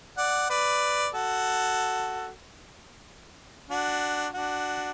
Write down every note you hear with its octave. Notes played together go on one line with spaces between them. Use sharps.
D5 F#5
B4 D5
F#4 A4
D4 F#4
D4 F#4